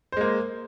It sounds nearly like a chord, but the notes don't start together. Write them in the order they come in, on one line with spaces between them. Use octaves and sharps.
C5 G#3 A#3